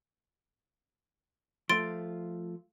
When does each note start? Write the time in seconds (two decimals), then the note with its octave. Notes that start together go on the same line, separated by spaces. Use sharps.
1.69 F3 A3 F4 C6 A6 D7